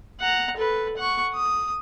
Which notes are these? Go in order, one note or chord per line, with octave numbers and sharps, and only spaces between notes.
F#5 A#5
A4 B4
F#5 C#6
D#6